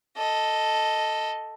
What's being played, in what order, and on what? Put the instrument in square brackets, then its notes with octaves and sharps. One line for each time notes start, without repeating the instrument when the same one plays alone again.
[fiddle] A4 D#5